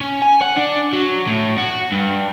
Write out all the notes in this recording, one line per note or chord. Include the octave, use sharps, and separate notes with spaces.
C#4
G#5
F#5
D4
F#3
A2
F#4
G2